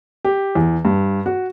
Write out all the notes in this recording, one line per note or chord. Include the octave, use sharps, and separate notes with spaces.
G4
E2
G2
F#4